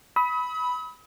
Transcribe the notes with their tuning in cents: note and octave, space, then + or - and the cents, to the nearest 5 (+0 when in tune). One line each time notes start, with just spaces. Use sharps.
B5 +0 D#6 +45